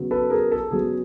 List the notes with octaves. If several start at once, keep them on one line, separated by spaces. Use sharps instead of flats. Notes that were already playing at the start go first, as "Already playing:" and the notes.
Already playing: C#3 F#3 B3
A4 B4
G#4 A#4
A4
C#3 F#3 B3 G#4